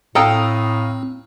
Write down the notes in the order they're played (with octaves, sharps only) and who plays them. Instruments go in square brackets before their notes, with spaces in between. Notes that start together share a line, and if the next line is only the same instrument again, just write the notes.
[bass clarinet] A2 [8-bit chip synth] C4 [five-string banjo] A4 G5 [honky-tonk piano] F5 A#5 D#6